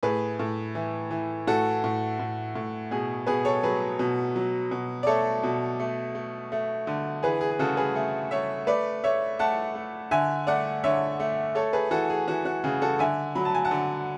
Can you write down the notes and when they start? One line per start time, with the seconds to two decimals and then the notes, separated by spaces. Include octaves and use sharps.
0.03 A2 G#4 B4
0.39 A2
0.75 E3
1.11 E3
1.47 A2 F#4 A4
1.84 A2
2.19 A2
2.55 A2
2.91 B2 G#4
3.27 B2 G#4 B4
3.45 A4 C#5
3.63 F#3 G#4 B4
3.99 B2
4.36 F#3
4.71 B2
5.03 D5
5.07 A3 A4 C#5
5.43 B2
5.80 A3
6.15 A3
6.52 A3
6.87 D3
7.23 E3 G#4 B4
7.41 G#4
7.51 G#4
7.59 C#3 F#4 A4
7.77 G#4 B4
7.95 A3
8.31 A3 C#5 E5
8.67 A3 B4 D5
9.04 A3 C#5 E5
9.39 A3 F#5 A5
9.75 A3
10.11 D3 E5 G#5
10.47 A3 D5 F#5
10.84 D3 C#5 E5
11.20 A3
11.55 A3 A4 C#5
11.73 G#4 B4
11.91 E3 F#4 A4
12.10 G#4
12.28 E3 F#4
12.45 F#4
12.64 C#3 G#4
12.82 F#4 A4
12.99 D3 E5 G#5
13.35 F#3 B5
13.45 A5
13.55 G#5
13.64 F#5 A5
13.71 D3